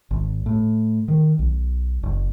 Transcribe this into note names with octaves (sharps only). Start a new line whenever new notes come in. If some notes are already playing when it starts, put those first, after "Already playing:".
G#1
A2
D#3
B1
F#1